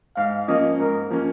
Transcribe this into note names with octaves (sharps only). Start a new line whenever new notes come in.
G#2 F5
F3 A#3 C#4 D#5
G#2 A#4
F3 A#3 C#4